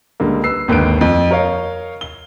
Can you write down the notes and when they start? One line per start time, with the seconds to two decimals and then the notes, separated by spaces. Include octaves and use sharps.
0.20 C#2 D3 G3 A#3
0.43 B4 E6 C7
0.68 G#1 D#2 D3 B4 D7
1.01 F2
1.31 A#4 C#5 D#5 F5
2.01 G7